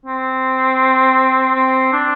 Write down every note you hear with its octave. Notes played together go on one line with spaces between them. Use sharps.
C4
C4
D4